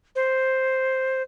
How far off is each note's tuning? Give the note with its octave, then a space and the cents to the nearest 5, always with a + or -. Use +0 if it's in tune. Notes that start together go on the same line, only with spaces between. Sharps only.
C5 +5